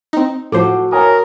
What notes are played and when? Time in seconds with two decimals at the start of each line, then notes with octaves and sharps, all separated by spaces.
0.13 C4 D#4
0.52 A2 F3 F#4 A4 C5 D6
0.92 A#4 C#5 G#5 D#6